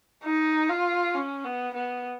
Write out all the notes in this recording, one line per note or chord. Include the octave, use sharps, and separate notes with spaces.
D#4
F4
C#4
B3
B3